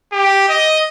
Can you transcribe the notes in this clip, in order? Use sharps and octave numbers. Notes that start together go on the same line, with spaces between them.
G4
D#5